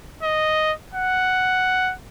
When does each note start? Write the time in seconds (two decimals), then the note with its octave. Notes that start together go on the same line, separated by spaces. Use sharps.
0.23 D#5
0.94 F#5